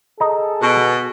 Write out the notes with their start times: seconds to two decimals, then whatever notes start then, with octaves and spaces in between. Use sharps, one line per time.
0.20 G#4 A4 D#5 A#5
0.61 B2